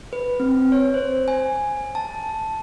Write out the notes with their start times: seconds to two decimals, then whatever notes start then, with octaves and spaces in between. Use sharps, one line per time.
0.13 B4
0.40 C4
0.72 C#5
0.94 C5
1.28 G#5
1.95 A5